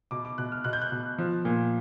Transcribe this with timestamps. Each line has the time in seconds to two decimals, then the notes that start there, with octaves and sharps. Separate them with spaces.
0.11 B2 D6
0.25 D6
0.38 B2 F#6
0.52 F6
0.64 B2 F#6
0.73 G6
0.82 F#6
0.92 B2
1.18 F3
1.45 A#2